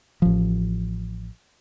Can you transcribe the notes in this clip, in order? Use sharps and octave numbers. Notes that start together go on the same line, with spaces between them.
A1 F3